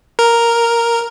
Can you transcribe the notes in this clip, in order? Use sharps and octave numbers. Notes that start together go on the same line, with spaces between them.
A#4